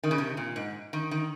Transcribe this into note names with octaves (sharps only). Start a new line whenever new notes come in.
D#3
C#3
C3
A#2
G#2
D#3
D#3